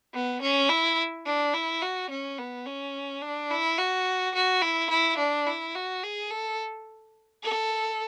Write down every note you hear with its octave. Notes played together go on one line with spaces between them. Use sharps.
B3
C#4
E4
D4
E4
F#4
C#4
B3
C#4
D4
E4
F#4
F#4
E4
E4
D4
E4
F#4
G#4
A4
A4